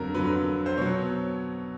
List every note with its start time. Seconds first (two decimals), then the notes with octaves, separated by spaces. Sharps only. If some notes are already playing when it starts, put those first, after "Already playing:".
Already playing: F2 D3 F#3 A#4
0.14 F2 D3 F#3 B4
0.66 C5
0.77 B2 F#3 C#5